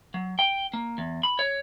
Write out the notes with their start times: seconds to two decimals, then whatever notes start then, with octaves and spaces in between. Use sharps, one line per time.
0.14 F#3
0.39 G5
0.73 A#3
0.98 E2
1.23 B5
1.39 C#5